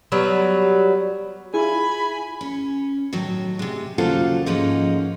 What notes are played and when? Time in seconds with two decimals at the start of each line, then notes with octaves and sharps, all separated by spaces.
0.12 F#3 G3 B3
1.54 E4 F4 G#4 E5 G#5 B5
2.41 C#4
3.13 A2 D#3 F#3
3.59 C3 G#3
3.98 D#2 C#3 F#3 F4 A4 C5
4.46 G#2 F3 G#3 A#3 C#4 D#4